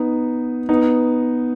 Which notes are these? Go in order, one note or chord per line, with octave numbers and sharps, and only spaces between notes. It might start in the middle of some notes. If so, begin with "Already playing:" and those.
Already playing: B3 D#4
B3 D#4